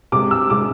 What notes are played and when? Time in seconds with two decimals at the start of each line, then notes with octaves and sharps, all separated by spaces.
0.12 C3 G#3 D6
0.31 E6
0.50 C3 G#3 D6